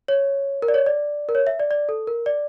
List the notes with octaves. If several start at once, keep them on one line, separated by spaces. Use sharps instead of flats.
C#5
A#4
D5
C#5
D5
A#4
C#5
E5
D5
D5
A4
A#4
D5